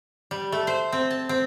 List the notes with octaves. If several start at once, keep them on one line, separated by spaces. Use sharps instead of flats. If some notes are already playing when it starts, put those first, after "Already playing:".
G3
A3
C5
C4
A5
C4